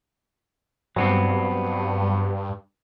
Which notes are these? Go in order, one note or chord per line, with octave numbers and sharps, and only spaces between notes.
G2 F#3 B3 C4